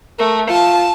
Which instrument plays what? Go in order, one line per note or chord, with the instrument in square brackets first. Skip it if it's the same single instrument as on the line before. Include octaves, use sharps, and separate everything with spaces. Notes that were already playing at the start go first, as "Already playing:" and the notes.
[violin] A3 [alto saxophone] A#4
[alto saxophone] F4 [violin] A5